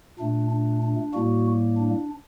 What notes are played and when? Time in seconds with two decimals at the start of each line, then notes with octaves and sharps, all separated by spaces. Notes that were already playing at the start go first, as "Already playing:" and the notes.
0.19 A#2 A3 D4
0.51 D4
0.83 D4
1.14 A2 G3 A#3 F#4
1.77 D4